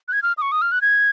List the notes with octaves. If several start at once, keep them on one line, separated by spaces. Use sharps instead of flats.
F#6
G#6
F6
D#6
C#6
D#6
F6
F#6
G#6